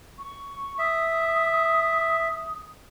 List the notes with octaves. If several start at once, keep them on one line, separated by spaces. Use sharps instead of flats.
C#6
E5 D#6